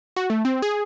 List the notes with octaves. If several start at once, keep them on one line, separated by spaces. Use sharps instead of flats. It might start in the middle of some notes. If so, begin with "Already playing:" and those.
F#4
A3
C4
G#4